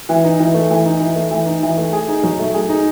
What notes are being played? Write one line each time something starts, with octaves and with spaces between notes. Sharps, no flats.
E3
D#4
E3
A3
E3
D#4
E3
A3
E3
D#4
E3
A3
G#4
D#4
F#3
A3
G#4
D#4